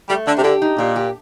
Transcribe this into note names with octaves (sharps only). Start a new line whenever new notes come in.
G3 A3
D3 D4
C3
D3 G4
D#4
A#2 G4
G4